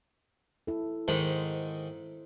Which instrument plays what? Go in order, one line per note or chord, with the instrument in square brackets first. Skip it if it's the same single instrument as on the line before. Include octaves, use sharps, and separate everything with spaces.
[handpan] E4 A4
[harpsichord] G#2 D#3 [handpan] C5